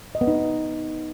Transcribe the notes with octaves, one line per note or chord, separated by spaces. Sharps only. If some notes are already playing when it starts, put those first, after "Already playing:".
D#5
B3
D#4